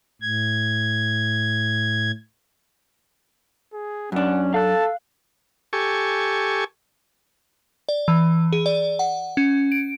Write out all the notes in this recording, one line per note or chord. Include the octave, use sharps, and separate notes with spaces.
A2 G#6
G#4
F#2 C#4 D4 F#5
A4 F5 A5 F#6
G4 A4 G#5 C#6
D5
E3
G#4
D5
F#5
C#4
D7